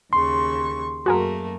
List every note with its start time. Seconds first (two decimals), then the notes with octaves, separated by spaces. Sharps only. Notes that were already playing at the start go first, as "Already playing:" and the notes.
0.13 D#2 C#3 C6 C#6
1.06 F#2 A3 A#3 F#4 G#4 A#4